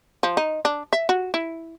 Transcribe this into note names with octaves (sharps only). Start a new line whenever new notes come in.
F3
D#4
D4
E5
F#4
E4